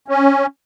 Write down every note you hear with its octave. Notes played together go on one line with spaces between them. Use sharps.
C#4